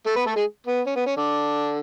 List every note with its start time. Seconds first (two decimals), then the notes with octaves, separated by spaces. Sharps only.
0.06 A3 A4
0.16 B3 B4
0.26 A3 A4
0.36 G#3 G#4
0.66 B3
0.86 C#4
0.96 B3
1.06 C#4
1.16 D3 D4